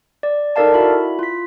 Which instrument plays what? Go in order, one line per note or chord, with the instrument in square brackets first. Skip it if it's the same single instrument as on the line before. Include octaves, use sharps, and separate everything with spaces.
[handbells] D5
D#4 A4 A#4 D5 F5 A5
E4 F#4 B5
F4 B6